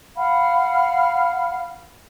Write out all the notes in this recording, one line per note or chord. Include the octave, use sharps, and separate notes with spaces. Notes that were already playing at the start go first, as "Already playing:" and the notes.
F5 F#5 B5 F6